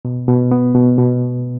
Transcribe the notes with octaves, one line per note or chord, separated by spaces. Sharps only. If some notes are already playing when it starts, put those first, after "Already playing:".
B2
B2
B3
B2
B2